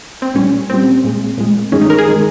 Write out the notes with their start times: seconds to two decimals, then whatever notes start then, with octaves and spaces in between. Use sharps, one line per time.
0.22 C4
0.35 A#2 G3 C#4
0.70 A#2 G3 C4
1.04 A#2 G#3
1.38 A#2 G#3
1.72 G2 D#3 G#3 C#4
1.81 D#4
1.90 A#4
1.98 G#4
2.08 D#3 G#3